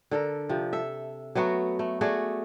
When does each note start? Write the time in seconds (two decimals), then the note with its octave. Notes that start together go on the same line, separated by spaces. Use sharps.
0.11 D3 A4 A#4
0.49 C3 F3
0.73 A4 E5
1.35 F#3 A3 B3 F#4
1.79 A3
2.01 A3 F#4 G#4 D5